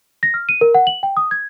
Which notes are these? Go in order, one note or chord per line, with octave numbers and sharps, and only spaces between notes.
A#6
F6
D#7
A#4
F#5
F#7
G5
D#6
G#6